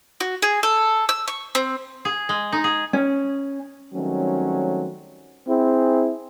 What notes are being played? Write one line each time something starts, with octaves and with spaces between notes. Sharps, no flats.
F#4
G#4
A4
E6
C#6
C4
G#4
G#3
D#4
G#4
C#4
D#3 F#3 G3 A3 C4 C#4
C4 E4 G#4